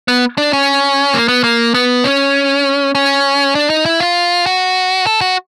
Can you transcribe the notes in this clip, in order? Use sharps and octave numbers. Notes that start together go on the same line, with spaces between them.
B3
D4
C#4
A#3
B3
A#3
B3
C#4
C#4
D4
D#4
E4
F4
F#4
A4
F#4